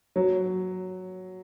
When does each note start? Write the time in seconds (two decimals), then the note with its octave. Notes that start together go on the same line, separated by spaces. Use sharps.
0.16 F#3